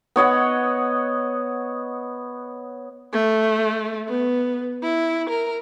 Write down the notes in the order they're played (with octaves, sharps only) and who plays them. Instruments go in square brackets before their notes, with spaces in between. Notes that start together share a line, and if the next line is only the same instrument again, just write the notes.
[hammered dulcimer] B3 C#5 D#5 F#5
[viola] A3
B3
E4
A#4